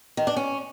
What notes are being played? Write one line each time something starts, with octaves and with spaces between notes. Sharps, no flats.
D#3
D4
C#4